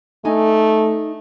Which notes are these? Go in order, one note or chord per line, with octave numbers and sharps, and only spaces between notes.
A3 D#4 A4 G#5